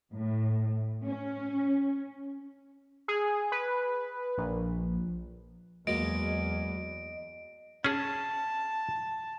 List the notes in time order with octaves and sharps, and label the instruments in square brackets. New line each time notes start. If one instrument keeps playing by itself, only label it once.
[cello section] A2
C#4
[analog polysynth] G#4
B4
A#1
[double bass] E2 [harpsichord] F#3 G#3 A#3 [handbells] D#5 [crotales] D7
[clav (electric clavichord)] C#4 G#4 [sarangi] A5